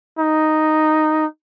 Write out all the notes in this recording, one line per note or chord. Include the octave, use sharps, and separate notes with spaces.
D#4